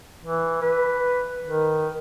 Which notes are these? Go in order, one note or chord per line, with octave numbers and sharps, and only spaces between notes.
E3
B4
D#3